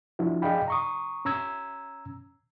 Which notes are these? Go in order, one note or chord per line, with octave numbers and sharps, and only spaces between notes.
F3 D4 E4 F#4
G#4 D5 D#5 F5 G5 B5
A#5 C#6 D#6
C#4 A#5 E6 G#6